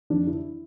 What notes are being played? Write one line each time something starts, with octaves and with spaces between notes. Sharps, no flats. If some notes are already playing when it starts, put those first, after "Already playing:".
F2 D4
D3 E4